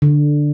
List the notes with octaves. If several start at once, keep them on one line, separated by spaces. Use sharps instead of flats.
D3